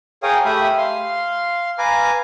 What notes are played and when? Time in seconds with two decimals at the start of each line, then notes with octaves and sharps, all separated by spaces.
0.23 G#4 A#4 C#5 F5 G5 D#6
0.45 A3 G4 E5 B5 D#6
0.78 F5 C6
1.78 B4 F5 G#5 A#5 D6